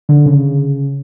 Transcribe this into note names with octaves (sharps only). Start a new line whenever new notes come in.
D3
C#3